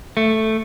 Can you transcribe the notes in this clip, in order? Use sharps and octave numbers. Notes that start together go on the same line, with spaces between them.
A3